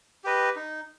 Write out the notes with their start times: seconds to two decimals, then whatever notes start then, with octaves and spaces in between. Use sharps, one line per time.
0.24 G4 B4 D#5
0.56 D#4